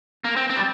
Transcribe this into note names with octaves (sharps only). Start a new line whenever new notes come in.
A#3
C4
C4
G3